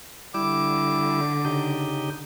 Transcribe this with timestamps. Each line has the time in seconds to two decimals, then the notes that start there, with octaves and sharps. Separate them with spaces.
0.34 D3 G3 E4 D6
1.45 C#3 D#4 G4